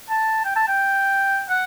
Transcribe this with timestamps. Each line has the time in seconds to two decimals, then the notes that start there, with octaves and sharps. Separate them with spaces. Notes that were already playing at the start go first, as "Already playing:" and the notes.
0.10 A5
0.45 G5
0.56 A5
0.68 G5
1.49 F#5